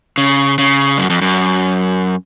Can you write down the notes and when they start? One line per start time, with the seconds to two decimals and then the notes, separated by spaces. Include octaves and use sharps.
0.18 C#3
0.58 C#3
0.98 F#2
1.10 F2
1.21 F#2